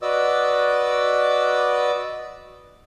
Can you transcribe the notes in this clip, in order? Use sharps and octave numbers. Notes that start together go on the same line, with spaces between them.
F#4 B4 D5 D#5 D6 E6